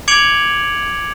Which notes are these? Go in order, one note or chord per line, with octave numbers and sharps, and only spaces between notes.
D6 G#6 C#7 D7 F7 F#7